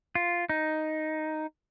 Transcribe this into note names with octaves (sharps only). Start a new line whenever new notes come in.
F4
D#4